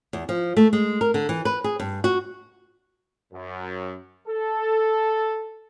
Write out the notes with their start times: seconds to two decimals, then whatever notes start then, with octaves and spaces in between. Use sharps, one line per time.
0.13 E2
0.29 F3
0.56 A3
0.73 G#3
1.01 A#4
1.14 D3
1.29 E3
1.45 B4
1.64 G#4
1.80 G2
2.04 F#4
3.33 F#2
4.28 A4